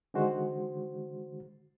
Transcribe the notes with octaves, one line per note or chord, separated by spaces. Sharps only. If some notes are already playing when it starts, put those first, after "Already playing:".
D3 D#3 G#3 F#4 C5